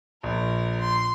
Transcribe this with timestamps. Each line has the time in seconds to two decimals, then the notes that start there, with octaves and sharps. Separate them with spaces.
0.23 A#1 A#4
0.80 C6